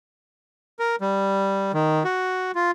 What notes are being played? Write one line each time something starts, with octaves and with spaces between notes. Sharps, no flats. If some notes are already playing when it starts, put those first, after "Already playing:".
A#4
G3
D#3
F#4
F4